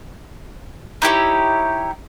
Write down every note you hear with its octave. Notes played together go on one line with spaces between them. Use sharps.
D#4 E4 G4 C#5